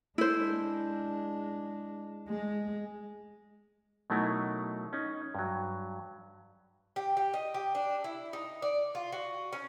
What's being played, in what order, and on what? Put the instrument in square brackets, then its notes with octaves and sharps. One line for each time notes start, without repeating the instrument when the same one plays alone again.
[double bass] G#3 D4 [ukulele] E4 C5
[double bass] G#3
[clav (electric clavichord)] B2 F#3 A3 D#4 E4 A#4
C#4 D#4
G2 F#3
[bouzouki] G4
G4
D#5
G4
D4
E4
D#4
D5
F4
F#4
C#4